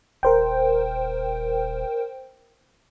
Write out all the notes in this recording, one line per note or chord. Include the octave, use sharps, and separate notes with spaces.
D#1 A#4 C5 G5